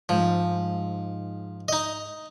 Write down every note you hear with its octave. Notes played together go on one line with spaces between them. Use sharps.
G#2 F3
D#4 D#5